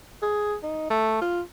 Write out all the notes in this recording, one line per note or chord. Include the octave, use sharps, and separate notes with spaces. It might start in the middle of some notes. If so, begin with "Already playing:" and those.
G#4
D#4
A3
F4